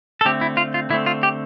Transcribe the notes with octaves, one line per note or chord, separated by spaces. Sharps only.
A4
D3 A3 C4 G4
E4
F4
F4
D3 A3 C4 E4
F4
G4